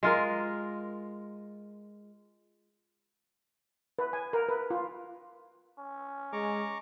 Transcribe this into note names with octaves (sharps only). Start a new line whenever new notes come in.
G#3 F4 A#4
B4
G#5
A#4
B4
F4
C#4
G#3 A#5 C#6 D6